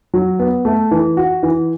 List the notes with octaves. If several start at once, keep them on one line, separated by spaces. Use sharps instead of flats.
F#3
B3
A3
E3
F#4
E3